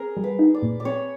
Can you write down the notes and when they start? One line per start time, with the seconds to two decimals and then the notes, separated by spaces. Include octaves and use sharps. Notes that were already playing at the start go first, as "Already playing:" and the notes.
Already playing: C4 G#4 A#4
0.17 G3
0.24 B4
0.39 D#4
0.54 D5
0.62 A#2
0.80 D5
0.85 C4 C#5